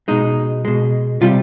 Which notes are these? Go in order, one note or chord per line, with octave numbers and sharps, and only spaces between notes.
B2 G#3 D#4
B2 G#3
C3 G3 F4